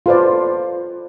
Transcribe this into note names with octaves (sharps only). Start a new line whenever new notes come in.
F4 A4 B4 C5 D5